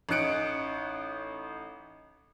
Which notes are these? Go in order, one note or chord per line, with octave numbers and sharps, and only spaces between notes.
A1 C#4 D#4 F#6 C#7 D7